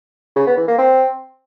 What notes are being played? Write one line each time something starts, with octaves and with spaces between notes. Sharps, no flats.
C#3
B3
E3
A#3
C4